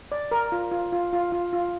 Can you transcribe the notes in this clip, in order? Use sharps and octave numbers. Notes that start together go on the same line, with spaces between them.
D5
A#4
F4
F4
F4
F4
F4
F4